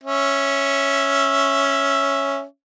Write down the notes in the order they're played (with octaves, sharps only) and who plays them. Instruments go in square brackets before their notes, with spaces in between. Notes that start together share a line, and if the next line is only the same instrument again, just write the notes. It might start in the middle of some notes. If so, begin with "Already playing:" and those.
[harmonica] C#4 E5